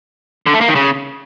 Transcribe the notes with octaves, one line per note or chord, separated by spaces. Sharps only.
D3
A3
A#3
D#3
C#3